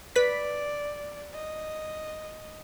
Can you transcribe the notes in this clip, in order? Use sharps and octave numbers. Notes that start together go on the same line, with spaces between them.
B4 D5 B6
D#5